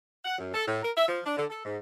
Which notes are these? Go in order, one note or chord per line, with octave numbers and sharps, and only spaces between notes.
F#5
F#2
A4
A2
A#4
E5
F3
D4
D3
A4
G#2